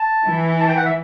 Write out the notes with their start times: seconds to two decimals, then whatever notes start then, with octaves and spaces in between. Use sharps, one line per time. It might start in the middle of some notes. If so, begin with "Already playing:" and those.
Already playing: A5
0.25 E3
0.60 A5
0.68 G5
0.77 F#5
0.86 E5